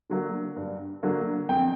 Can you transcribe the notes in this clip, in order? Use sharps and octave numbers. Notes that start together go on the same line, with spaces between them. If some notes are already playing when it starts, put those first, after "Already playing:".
D3 F#3 A#3
G2
D3 F#3 A#3
F2 G5